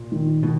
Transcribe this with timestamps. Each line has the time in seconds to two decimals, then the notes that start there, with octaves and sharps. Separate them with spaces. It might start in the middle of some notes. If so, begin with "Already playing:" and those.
Already playing: A#2
0.12 D#3
0.43 B2 D#3